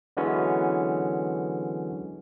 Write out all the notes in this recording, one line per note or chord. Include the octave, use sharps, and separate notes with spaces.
D3 E3 F#3 G#3 B3 C#4